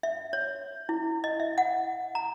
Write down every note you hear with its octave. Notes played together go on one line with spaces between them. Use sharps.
E5
C#5
E4
D#5
E5
F#5
A#5